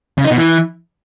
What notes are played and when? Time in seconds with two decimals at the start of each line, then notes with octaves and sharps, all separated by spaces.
0.18 C#3
0.24 D#4
0.31 B2
0.37 E3